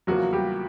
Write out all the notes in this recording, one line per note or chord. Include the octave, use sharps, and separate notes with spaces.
E2 C#3 F3 F#3 A#3 F#4
G3 G4